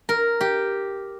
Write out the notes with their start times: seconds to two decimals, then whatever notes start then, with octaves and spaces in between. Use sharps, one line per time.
0.09 A#4
0.41 G4